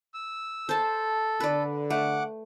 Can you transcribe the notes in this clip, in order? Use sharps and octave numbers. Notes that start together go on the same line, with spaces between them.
E6
A4 C5 A5
D3 B4 D5
A3 F#5 D6